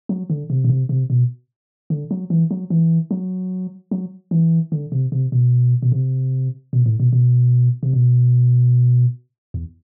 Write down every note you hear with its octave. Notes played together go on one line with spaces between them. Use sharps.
F#3
D3
C3
B2
C3
C3
B2
D3
F#3
E3
F#3
E3
F#3
F#3
E3
D3
C3
C3
B2
B2
C3
B2
A2
B2
B2
C3
B2
E2